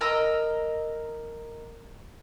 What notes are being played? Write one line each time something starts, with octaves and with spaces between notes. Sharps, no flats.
A#4 D#5 A#5 E6